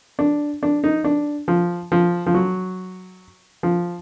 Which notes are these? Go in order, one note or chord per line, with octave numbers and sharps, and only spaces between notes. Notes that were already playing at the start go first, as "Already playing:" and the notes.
D4
D4
D#4
D4
F3
F3
F3
F#3
F3